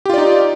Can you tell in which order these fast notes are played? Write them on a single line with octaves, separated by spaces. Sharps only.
G4 F4 D5 D#4